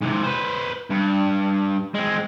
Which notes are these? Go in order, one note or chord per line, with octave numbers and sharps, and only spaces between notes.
G#2 C3
B4 C5
G2
G#3 C4